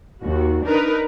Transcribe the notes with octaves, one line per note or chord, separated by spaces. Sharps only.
D#2 F#4
D4 D#4 A#4 B4